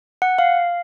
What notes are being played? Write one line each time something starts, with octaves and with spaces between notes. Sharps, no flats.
F#5
F5